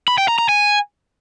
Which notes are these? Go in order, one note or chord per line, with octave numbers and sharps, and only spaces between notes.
B5
G5
A#5
A#5
G#5